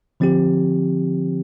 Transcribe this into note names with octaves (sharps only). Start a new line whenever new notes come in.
D3 F3 C4 G4